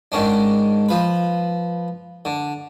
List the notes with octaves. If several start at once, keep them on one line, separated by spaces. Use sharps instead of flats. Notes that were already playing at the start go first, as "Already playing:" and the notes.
G#2 D#3 C#4 D4
F3 B4
D3